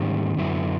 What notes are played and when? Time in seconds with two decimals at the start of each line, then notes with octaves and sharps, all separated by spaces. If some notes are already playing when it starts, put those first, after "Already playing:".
Already playing: G#2 D#3 G3 A#3 C#4
0.38 F#2 D3 F#3 B3 E4